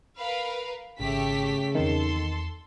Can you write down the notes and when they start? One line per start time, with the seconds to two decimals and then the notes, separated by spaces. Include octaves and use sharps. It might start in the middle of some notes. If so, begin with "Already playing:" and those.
0.17 A#4 B4 F5
1.00 G#1 C#3 A3 G4 B6
1.75 E2 D#3 B3 C4 A4 C6